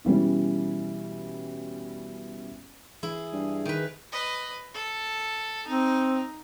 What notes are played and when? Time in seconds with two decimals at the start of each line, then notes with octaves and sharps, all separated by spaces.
0.05 B2 E3 G3 C#4
3.03 E3 E4 G#4
3.33 G2
3.65 D#3 D#4 B4
4.12 B4 D#5
4.74 A4
5.67 C4 D#4